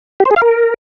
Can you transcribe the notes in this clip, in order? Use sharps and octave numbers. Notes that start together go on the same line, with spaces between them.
G4
C5
G#4
F5
A#4